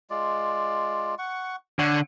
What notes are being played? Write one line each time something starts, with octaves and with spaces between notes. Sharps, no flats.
G#3 F4 D5
F#5 C#6
D3 C#5 F#5 C#6